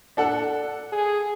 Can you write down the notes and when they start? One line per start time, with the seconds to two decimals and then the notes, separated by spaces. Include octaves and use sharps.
0.17 D4 A4 F#5
0.92 G#4